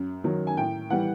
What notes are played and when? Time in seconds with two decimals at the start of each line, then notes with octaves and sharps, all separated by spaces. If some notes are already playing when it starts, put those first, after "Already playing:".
Already playing: F#2
0.24 D#3 F#3
0.47 G#5
0.57 A2 G5
0.90 E3 G3 F#5